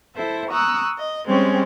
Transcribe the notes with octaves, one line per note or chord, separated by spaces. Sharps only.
E4 A4 C5 E5
A#5 C#6 D#6 E6 F#6
D#5
G3 G#3 C4 C#4 C#5